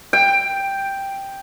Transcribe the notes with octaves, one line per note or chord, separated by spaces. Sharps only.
G5